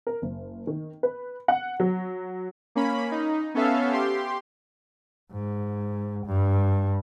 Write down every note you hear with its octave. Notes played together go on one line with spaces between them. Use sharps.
A#4
F#1
D#3
B4
F#5
F#3
A#3 C#4 B5
D#4
B3 C#4 A4 E5 F5
G4 C6
G#2
G2